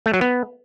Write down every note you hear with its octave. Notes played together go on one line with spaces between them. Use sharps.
A3
F#3
B3